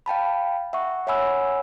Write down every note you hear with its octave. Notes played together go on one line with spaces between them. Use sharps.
F5 G5 A5 B5
E5 F#5 C#6
C#5 E5 F#5 G#5 B5 E6